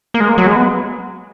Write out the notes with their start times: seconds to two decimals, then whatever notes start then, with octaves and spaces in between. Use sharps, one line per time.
0.14 A#3
0.20 G#3
0.29 A#3
0.38 F#3
0.47 G#3
0.56 B3